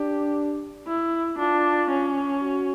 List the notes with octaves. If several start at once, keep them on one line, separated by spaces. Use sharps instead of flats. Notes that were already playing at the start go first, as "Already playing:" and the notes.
Already playing: D4 G4
E4
D4 F4
C#4
F#4